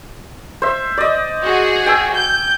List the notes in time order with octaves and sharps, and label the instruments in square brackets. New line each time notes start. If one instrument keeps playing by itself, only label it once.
[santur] C5 E5
D5 D#5
[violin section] F#4 G#4
[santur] G5 G#5 E6
[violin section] G6